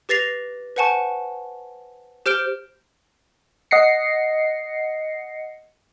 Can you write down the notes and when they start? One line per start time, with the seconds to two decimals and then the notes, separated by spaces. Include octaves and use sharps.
0.09 G4 B4 A6 A#6 C7 F7
0.76 B4 C5 F#5 G#5 A5 C#6
2.26 G4 C5 F6 G6 D7 G7
3.71 D#5 F#5 A#6 C7 C#7